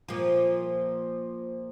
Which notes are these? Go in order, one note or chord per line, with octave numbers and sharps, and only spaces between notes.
A#2 F3